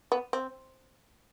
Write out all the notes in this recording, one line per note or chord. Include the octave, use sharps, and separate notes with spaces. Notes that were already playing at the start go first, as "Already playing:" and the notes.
B3
C4